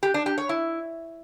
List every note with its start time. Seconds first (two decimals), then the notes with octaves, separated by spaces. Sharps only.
0.03 G4
0.14 D4
0.26 G4
0.38 C#5
0.49 E4